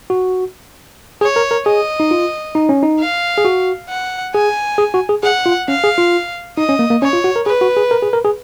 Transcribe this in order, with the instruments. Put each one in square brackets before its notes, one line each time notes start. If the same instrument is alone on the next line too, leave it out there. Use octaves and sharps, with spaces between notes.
[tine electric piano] F#4
[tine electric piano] G#4 [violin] C#5
[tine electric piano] A#4
A#4
[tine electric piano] G#4 [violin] D#5
[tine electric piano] D#4
F4
D#4
C#4
D#4
[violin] F5
[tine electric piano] G#4
F#4
[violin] F#5
[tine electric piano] G#4 [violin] G#5
[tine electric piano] G#4
F#4
G#4
[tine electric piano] G#4 [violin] F#5
[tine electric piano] F4
[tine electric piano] C#4 [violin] F5
[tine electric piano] G#4
F4
[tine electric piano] D#4 [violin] D#5
[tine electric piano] C#4
A#3
A#3
[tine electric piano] C#4 [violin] C#5
[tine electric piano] F4
F#4
A#4
[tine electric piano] G#4 [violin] B4
[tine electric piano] F#4
G#4
A#4
G#4
A#4
G#4